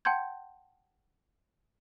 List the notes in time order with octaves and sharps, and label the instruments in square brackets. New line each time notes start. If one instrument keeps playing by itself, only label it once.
[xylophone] F#5 G5 A5 C6 G6 G#6